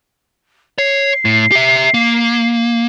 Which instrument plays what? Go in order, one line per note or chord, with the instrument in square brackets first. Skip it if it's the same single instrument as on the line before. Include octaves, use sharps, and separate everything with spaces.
[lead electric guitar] C#5 [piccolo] C7
[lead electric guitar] A2
G4 E5
A#3